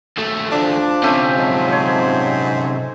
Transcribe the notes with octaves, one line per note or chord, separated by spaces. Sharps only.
D#2 A3
F3 D4
C3 A3 C#4 E5 G5
G#2 F#3
C5 C#5